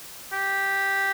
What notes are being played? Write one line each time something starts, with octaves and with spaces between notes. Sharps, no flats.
G4